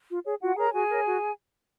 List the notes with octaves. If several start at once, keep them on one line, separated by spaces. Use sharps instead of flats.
F4
G#4 C#5
F4 F#4 F#5
G#4 A#4 C#5 A#5
F#4 G#4 G#5
A#4 C#5
F#4